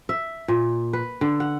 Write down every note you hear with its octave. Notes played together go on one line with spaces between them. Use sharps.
E5
A#2
B4
D3
F#5